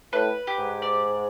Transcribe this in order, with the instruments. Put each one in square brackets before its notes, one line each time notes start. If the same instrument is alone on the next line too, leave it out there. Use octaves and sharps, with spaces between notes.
[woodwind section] A2 [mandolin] B4
[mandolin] G4
[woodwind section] G#2
[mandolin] D5